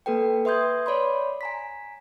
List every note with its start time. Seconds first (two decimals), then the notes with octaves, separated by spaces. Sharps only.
0.06 A#3 A4 B4 G5
0.45 B4 E5 C6 D#6 G6 G#6
0.86 C#5 D5 B5 C6
1.41 G#5 A#5 B6